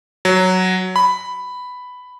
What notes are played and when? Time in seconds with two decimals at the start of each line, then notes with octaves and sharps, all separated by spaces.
0.25 F#3
0.96 B5